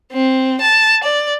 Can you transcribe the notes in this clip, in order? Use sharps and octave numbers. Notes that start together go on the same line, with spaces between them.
C4
A5
D5